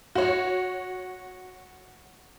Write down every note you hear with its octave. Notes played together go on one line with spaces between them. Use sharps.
F#4 C#5